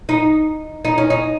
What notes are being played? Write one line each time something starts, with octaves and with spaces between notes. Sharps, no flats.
D#4
D#4
C#4
D#4